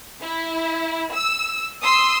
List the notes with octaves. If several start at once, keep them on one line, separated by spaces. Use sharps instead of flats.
E4
E6
C6 D#6 E6